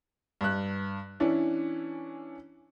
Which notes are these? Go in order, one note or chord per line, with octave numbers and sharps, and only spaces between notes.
G2 F#6
E3 C#4 D4 E4